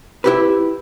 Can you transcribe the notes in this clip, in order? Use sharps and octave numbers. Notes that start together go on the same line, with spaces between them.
E4 G4 B4